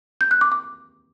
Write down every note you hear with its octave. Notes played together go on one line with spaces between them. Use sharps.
G6
F#6
D6
D6